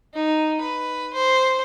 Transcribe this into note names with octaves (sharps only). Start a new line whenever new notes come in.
D#4
B4
C5